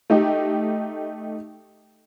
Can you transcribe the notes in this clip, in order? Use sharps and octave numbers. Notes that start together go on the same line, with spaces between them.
A3 D#4 G4